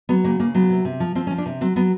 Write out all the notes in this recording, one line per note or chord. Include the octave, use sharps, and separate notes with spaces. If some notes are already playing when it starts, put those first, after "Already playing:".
F#3 B3
C#3 A#3
C#3 A#3
F#3 B3
C3
C3
F3
F3 C4
C#4
F3
D4
C3
F#3 C4
F#3 B3